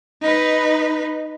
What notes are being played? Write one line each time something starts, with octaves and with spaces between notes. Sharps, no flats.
D#4 B4